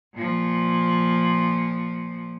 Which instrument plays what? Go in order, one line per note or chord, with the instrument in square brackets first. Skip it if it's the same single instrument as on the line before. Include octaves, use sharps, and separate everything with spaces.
[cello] A#2 F3